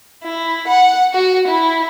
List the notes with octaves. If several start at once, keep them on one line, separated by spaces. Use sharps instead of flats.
E4
F#5
F#4
E4